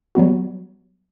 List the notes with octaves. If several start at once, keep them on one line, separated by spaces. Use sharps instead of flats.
F#3 G3 B3 F#4